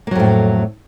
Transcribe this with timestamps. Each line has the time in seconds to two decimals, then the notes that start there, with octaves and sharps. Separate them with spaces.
0.07 A#3
0.11 F#3
0.15 F2
0.20 A2